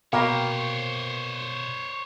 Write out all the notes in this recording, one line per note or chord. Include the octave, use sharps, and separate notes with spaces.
B2 A#3 C5 C#5 F5 G5 B5